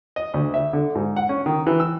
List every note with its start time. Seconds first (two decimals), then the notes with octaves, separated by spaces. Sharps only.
0.16 D#5
0.34 D2
0.54 E5
0.73 D3
0.95 G#2
1.16 F#5
1.29 C#4
1.46 D#3
1.67 E3
1.80 E6